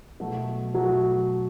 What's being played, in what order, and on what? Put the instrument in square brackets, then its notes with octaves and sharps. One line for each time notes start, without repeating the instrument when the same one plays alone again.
[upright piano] B2 F#3 A3
B2 F#3 A3